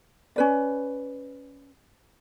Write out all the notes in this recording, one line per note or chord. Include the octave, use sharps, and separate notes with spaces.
C#4 B4 D5